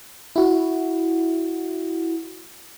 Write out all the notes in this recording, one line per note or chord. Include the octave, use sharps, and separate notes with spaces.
E4 F#4